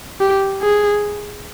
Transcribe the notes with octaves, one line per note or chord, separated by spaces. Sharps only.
G4
G#4